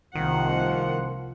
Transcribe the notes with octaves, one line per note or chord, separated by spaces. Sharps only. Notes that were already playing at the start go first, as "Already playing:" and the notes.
C2 D#3 F3 A#3 F#5